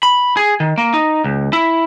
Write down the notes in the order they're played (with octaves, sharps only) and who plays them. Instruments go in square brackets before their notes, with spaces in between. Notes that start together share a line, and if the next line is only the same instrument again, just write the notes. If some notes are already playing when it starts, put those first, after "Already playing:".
[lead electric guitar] B5
G#4
D#3
A#3
D#4
C#2
E4